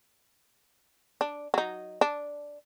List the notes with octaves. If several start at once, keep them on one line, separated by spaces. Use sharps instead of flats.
D4
F#3 D#4
D4